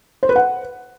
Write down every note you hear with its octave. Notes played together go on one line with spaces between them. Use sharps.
C5
B4
F#5